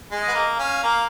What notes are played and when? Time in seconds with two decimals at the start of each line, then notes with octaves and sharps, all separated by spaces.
0.11 G#3
0.22 D#5
0.28 B3
0.34 A#3
0.59 C#4 F5
0.83 A#3